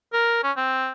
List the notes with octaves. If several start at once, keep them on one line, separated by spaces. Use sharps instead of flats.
A#4
C#4
C4